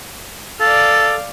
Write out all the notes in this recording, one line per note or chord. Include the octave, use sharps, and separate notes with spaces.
A4 D5 F5